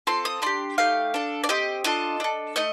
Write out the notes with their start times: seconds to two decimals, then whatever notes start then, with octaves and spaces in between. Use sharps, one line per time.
0.07 C4 F4 A4 C6
0.25 D#6
0.42 D4 G4 C6
0.78 A3 D#4 G4 F5
1.14 D4 A4
1.44 D5
1.49 C4 G4 D#5
1.84 D4 F4 A4 D#5
2.20 D4 A4
2.56 A3 D#4 D#5